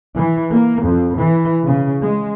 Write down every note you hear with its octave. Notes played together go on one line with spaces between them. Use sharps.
E3
A#3
F2
E3
C#3
G#3